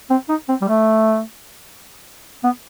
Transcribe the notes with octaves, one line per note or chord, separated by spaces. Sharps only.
C4
D#4
C4
G3
A3
B3